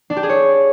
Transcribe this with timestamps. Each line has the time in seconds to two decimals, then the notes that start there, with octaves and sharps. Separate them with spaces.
0.10 D4
0.16 G4
0.23 G#4
0.29 C#5